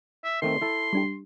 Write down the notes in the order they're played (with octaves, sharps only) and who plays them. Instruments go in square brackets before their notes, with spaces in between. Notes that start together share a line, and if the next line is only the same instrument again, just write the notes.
[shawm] E5
[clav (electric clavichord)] D#3 A3 C4 [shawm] C6
[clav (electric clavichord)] E4 A4
[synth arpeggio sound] G3 D4 G4